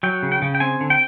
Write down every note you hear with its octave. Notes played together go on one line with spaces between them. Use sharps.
F#3 G5
C#3
G5
C#3
G5
C4 G#5
D3
G5